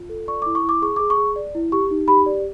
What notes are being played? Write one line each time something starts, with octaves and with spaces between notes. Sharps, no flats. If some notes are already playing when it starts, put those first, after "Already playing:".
Already playing: F4
A4
D5 C#6
E4 D6
C#6
E4
D6
G#4 C#6
G#4 D6
C#6
G#4
D5
E4
G4 C#6
D#4
G4 B5
D5